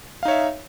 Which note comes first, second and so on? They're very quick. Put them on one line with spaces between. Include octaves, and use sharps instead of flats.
F5 D#4 C#5 E5